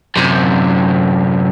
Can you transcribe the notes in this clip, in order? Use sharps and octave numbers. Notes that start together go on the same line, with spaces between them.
F#2 C3